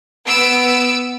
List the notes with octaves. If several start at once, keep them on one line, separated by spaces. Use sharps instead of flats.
B3 E6 D7